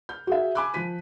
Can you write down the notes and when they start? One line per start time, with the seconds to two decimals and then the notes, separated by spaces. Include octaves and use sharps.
0.09 F6 G6
0.27 F#4 G#4 E5
0.55 G#5 B5 D6 E6 F#6
0.74 F3 F4 F#6 B6 D#7